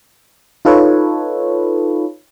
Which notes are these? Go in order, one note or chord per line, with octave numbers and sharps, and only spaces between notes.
D#4 F4 A4 B4 C#5